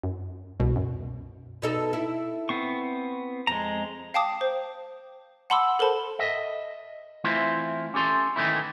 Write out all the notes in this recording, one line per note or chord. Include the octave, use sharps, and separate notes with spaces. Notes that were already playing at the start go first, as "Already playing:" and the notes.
F#2
C2 B2
F#2
B2 D#4 A4
E4
B3 C4 C#6
F2 G#3 A#5
F5 G5 A5 D6 D#6
C5
F#5 A5 B5 C6 D6 E6
A4 A#4 C5 A5 B5
D#5 E5
E3 A3 C4 E4 F4
C#4 G4 A4 C6
D#3 E3 A3 A#3 C#4 E4